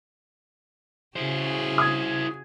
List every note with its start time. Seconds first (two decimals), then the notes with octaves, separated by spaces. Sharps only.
1.16 C#3 E4 F#4 G#4 C5
1.78 D#6 G#6